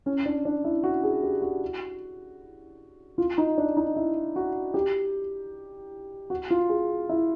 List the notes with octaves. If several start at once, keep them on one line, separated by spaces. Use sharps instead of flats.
C#4
D4
D4
E4
F#4
G#4
G4
F#4
F4
D#4
D4
D#4
E4
F#4
G4
F#4
F4
G#4
E4